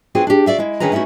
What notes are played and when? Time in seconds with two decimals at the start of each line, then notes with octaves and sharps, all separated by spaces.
0.15 B3 C4 D4 F4 F#4 G#4
0.27 D4 G4
0.46 F#4 D5 E5 F5
0.58 G#3 E4
0.80 D3 D#3 C#4 G#4 B4 A#5
0.92 A3 C#4 D#4 E4 F#4